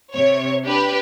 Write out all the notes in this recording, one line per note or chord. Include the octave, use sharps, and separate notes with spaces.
C3 C#5
D4 G4 B4